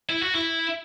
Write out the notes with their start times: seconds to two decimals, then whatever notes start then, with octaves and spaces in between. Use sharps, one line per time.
0.09 E4
0.22 F#4
0.35 E4